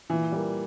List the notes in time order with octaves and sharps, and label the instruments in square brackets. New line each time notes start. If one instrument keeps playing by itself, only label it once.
[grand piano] A#2 [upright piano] E3
[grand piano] G3 A#3